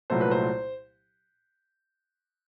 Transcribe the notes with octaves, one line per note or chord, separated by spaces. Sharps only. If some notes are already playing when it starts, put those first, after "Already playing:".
C2 A#2 F#3 A3 C5
B4
C5